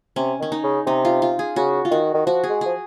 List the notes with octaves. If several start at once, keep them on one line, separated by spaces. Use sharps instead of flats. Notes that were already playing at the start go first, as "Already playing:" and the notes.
C3 C#4
D#3 C#4
D#4
C#3
C3 D#4
F4
F4
G#4
C#3 F#4
F4
D#3 F#4
D#3
F3 F#4
G#4
G#3
F3 G#4